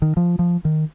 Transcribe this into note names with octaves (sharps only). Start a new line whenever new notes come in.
D#3
F3
F3
D#3